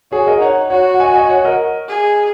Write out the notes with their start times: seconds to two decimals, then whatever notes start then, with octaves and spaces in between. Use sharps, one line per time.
0.12 F#4 G#4 C#5
0.27 A#4 D#5
0.41 D#4 C#5 F#5
0.70 F#4 C#5 F#5
0.94 F#5
1.00 D#5 G#5
1.14 D#5 G#5
1.29 C#5 F#5
1.45 A#4 D#5
1.89 G#4